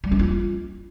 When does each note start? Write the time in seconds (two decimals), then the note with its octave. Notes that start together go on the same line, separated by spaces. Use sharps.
0.04 G3
0.11 D4
0.19 F4